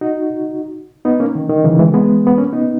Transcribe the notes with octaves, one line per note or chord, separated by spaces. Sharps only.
D#4 F#4
B3 D#4
A#3 C#4
D#3
D#3
C#3 E3
E3 G#3
G#3 B3
B3
A#3 C#4
B3 D#4